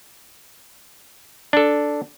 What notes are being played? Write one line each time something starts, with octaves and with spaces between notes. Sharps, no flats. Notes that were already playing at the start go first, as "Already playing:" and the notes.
D4 A4